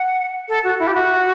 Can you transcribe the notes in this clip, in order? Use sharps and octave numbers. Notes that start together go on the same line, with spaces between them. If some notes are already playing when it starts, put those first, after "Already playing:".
Already playing: F#5
A4
F#4
E4
G4
F#4